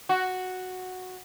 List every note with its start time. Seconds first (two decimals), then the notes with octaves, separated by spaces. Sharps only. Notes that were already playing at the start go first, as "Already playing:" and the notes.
0.09 F#4